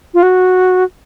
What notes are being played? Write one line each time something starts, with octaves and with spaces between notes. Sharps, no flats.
F4
F#4